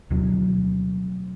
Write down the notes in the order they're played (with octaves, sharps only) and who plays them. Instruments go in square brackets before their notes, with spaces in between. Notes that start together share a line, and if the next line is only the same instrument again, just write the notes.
[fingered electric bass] D2 B2 F#3